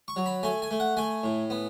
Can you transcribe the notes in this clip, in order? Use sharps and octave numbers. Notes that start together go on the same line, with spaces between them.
C#6
F#3
B5
A3 G#5
G#5
A3
F#5
A3 G#5
A2
B3